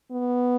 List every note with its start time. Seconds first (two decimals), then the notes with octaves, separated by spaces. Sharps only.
0.12 B3